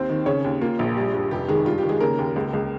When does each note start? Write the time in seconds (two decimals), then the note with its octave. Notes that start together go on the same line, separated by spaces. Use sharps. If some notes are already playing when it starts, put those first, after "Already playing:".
Already playing: D#2 C4 C5
0.10 D#3
0.26 C#3 C#4 C#5
0.44 D#2
0.61 A#3 F4
0.79 A#1
0.97 G3
1.14 G2
1.31 F1 G4
1.49 D#3 G#3 G#4
1.66 G2 F4
1.78 G4
1.83 D#3
1.89 G#3 G#4
2.00 C#3 A#3 A#4
2.19 D#2
2.36 C#2
2.53 C#2